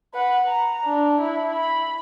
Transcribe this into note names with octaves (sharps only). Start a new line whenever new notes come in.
B4 F#5
A#5
D4
E4
B5